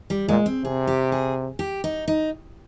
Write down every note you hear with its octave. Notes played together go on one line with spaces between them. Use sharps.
G3
A#2 G#3
C4
C3 G#4
G4
G#4
G4
D#4
D#4